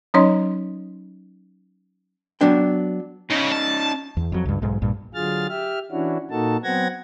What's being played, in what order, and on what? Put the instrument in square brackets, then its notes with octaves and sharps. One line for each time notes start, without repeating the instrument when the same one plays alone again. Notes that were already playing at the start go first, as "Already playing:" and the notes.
[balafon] F#3 C#4 D#4 C#5 D#5 C6
[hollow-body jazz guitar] F#3 B3 D4 G5
[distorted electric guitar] C#3 [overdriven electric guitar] C#4 D#4
[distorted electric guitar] A5
[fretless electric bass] E2
F2 F#3
C#2 G2
B1 G#2
A#1 G2 A#2
[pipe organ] D3 F#3 F4 G#4 F6 A6
G4 E5 F6
E3 C#4 D4 E4 F#4
A#2 A#3 D#4 F#4 A4 A5
F#3 B3 C4 F#5 G#6 A#6